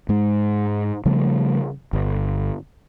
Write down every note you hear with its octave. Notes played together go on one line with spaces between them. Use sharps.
G#2 G#3
C#3 F3 G3 A3
G1